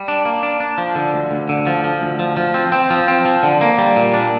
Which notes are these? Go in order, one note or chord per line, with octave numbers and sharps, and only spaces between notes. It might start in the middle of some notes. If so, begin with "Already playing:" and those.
Already playing: G3
D4
A#3
D4
D4
F3
D3
D2
D2
D3
F3
F3
D2
F3
F3
C4
C4
F3
C4
F3
D3
A#3
G3
A#2
D4